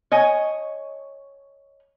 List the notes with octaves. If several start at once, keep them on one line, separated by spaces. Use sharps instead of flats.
C#5 D#5 G#5